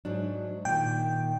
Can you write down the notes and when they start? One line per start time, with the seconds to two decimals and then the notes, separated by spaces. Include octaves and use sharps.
0.05 G#2 F#3 D4
0.65 A#2 D#3 G5